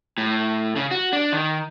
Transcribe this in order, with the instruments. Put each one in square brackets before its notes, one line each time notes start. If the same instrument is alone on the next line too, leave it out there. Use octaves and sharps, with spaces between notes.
[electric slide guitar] A2
C#3
F#4
D4
D#3